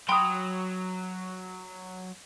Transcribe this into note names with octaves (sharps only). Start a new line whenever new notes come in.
F#3 G5 B5 C6 D#6